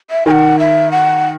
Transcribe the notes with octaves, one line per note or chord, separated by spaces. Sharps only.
E5
D#3 G#5
F#5
E5
F#5